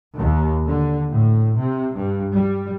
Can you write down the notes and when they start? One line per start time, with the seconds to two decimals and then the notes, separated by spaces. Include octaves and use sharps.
0.17 D#2
0.67 D3
1.11 A2
1.57 C3
1.96 G2
2.33 G3